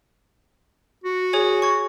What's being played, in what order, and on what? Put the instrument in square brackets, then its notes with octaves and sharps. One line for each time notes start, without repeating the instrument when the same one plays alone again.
[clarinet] F#4
[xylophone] G#4 C#5 G#5
C#6 G#6